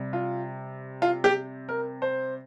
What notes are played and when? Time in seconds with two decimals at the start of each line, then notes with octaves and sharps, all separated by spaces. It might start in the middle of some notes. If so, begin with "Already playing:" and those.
Already playing: C3 G3
0.13 F4
1.02 F4
1.24 G4
1.69 A#4
2.02 C5